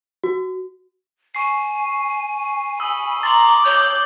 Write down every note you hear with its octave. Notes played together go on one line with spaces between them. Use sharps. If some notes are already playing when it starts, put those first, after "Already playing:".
F#4
G#5 C#6 C7
B5 D#6 E6
A#5 C6 D6 A6 F#7
C#5 G6